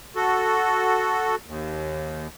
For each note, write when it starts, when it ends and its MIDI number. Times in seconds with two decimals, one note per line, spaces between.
0.16 1.35 66
0.16 1.35 69
1.45 2.27 39